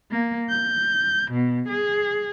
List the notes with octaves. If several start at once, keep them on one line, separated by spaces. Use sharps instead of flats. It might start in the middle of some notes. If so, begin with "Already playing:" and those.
A#3
G6
B2
G#4